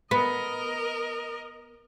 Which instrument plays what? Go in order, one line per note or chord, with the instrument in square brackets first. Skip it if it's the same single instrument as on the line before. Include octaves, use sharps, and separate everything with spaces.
[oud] B3 [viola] A#4 D#5